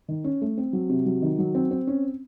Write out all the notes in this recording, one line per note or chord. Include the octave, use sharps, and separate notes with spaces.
D#3
C#4
A3
C4
F#3
C3
F#3
D#3
F#3
C4
C4
C#4